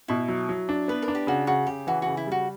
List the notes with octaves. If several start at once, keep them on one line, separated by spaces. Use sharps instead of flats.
B2 E4
F#3
F#3
D4
B3 B4
A#4
D4
G4
C#3 F#4
C#3 F#4
C#3 G4
E3 F#4
C#3 F#4
E4
G3 F#4